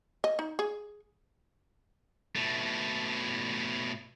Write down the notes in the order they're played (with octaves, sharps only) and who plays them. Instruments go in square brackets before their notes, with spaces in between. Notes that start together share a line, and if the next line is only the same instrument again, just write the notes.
[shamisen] D#5
D#4
G#4
[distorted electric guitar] B2 A3